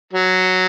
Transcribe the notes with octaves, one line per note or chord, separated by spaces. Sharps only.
F#3